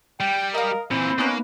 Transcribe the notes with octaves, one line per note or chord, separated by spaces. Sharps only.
G3 G5
A#4 D#5 F5
A#2 E3 C4 E4
A#3 B3 C#4 D#4 B4